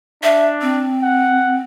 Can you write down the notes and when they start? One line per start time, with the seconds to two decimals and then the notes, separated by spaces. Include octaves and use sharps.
0.23 D4 E5
0.62 C4
1.02 F#5